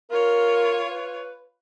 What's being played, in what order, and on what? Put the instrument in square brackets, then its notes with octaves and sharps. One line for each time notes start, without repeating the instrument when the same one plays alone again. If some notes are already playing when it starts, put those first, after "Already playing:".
[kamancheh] F4 C#5 [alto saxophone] A#4
[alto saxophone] B4